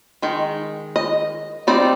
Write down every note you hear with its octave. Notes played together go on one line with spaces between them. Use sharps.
D#3 G#3
D#5
G3 C4 D#4 D5